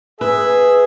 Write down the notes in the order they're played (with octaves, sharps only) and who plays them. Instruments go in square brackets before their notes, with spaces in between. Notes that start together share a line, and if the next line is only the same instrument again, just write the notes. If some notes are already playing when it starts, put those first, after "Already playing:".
[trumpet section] G#4 [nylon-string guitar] B4 [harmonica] E5